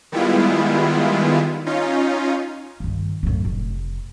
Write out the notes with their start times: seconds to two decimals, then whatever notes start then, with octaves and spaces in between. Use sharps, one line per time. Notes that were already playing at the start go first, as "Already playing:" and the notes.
0.12 D#3 G3 G#3 B3 E4 F4
1.66 C#4 D#4 F4
2.80 G2 D#3
3.23 F#2 A2
3.45 F1